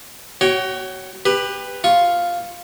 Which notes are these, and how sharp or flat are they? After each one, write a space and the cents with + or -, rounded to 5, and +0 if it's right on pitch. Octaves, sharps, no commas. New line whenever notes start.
F#4 +25 C#5 +0 G5 +0
G4 +25 B4 +0
F4 +0 C#6 +0